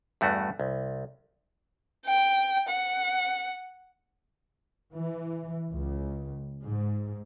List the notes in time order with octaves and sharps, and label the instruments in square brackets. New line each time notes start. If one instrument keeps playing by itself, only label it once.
[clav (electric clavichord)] E2 G2 A3 F#4
C2
[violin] G5
F#5
[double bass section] E3
C#2
G#2